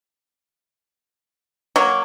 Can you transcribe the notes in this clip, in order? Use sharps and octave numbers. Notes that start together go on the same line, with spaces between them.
F#3 A#3 C#5